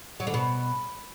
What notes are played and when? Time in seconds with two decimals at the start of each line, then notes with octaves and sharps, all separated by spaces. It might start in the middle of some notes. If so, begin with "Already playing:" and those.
0.20 F#3
0.27 D3
0.34 B2